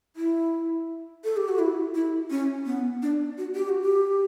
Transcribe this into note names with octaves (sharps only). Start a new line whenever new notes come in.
E4
A4
G4
F#4
E4
E4
C#4
B3
D4
F#4
G4
F#4
G4